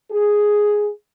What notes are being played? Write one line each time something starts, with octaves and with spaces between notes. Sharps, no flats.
G#4